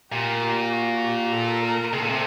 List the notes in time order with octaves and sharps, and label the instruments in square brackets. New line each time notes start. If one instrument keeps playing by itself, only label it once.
[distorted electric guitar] A#2 [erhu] G4
[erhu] G4
F#4
G4
A4
A#4
[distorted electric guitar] C3 [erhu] A4
[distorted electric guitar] A#2
C3